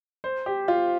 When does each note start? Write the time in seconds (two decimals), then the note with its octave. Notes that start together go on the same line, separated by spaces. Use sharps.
0.24 C5
0.46 G4
0.68 F4